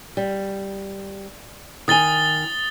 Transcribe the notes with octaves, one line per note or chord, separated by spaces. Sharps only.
G3
D#3 G#5 D#6 A6 G7